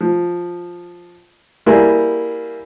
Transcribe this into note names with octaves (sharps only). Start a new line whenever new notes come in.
F3
G3 A#3 E4 G#4 A#4